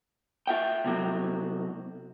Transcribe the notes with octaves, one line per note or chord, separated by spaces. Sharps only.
F4 E5 G5
C2 C3 F#3